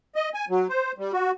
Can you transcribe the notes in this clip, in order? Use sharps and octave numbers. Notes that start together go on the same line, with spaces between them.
D#5
G#5
F#3
C5
G3
F#4